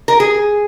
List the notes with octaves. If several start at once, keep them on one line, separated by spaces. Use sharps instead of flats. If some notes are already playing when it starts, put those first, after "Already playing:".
A#4
G#4